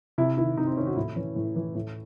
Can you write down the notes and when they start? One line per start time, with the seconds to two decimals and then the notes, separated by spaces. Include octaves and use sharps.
0.18 C3 E4
0.37 D#3 E4
0.57 C3 D#4
0.67 C4
0.77 D#3 C#4
0.87 F#4
0.96 A2 E4
1.16 E3 C#4
1.36 A2
1.56 E3
1.75 A2